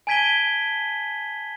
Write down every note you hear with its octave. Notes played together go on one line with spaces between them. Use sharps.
G#5 A5 G#6 B6 D#7 G7